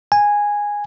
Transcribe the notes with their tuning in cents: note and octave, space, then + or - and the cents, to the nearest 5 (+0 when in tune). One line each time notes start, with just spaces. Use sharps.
G#5 -10